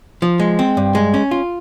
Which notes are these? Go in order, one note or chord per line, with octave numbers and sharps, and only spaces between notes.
F3
G#3
C4
G2
G#3
C#4
F4